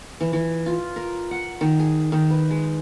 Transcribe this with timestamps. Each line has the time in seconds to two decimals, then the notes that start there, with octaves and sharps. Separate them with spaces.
0.21 E3
0.33 E3
0.66 F4
0.96 A#4
1.31 F#5
1.61 D#3
1.79 G#4
2.12 D#3
2.30 B4
2.51 G#3